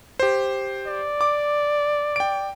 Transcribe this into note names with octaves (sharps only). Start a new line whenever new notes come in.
G4 C5
D5
D6
G5 D7